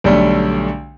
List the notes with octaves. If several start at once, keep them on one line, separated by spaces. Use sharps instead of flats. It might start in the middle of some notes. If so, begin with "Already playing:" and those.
B1 D3 G3 A3